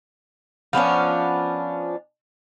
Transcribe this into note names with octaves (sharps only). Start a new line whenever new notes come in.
F3 B3 C#4 D4